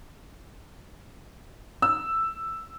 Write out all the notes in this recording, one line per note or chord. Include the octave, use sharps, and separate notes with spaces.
E6